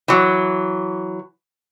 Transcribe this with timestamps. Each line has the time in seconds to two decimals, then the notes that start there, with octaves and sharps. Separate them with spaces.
0.08 E3 F#3